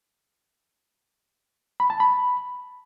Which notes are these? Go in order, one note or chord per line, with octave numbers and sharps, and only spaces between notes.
B5
A5
B5